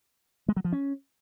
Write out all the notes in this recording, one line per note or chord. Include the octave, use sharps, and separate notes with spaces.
G#3
F#3
F3
C#4